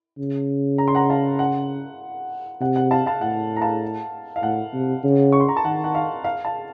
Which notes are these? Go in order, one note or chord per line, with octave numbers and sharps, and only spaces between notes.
C#3
A#5
C6
F#5 A#5
F5 A5
F#5
C3 F#5
F#5
F5 A5
F5 A5
A2 F#5
A#5
F5 A5
F5
A2 F#5
C3
C#3
C#6
C6
A#5
A5
D#3 F#5
F#5
F5
F5
F5 A5